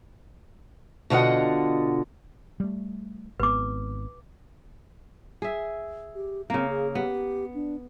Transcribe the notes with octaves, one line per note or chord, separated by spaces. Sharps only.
B2 D3 F4 D#5 F#5
G3 A3
G#1 B3 B4 D6
G#4 E5
G4
C#3 A#3 C4
G#4
B3 G4
D4